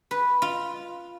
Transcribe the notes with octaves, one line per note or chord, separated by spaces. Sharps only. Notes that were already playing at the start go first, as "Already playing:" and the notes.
B4
F4